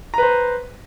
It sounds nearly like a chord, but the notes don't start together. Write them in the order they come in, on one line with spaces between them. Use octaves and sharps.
A#5 B4 C5